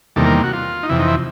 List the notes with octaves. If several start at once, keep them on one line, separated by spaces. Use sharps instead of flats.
E2 C3 D#3 G3 A#3 A4
A#4
F#4
F4
D#4
F2 C3 E3 E4
D#4
E4